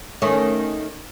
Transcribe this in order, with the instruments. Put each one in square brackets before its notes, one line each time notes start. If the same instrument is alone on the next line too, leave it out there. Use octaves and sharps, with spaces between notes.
[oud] D#3 A3 C#4